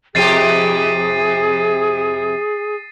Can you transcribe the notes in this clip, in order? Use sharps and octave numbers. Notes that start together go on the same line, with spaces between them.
F2 C3 G4 G#4 A6 C7 D#7